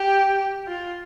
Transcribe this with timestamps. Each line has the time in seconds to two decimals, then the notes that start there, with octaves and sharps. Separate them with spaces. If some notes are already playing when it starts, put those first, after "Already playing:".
Already playing: G4
0.67 F4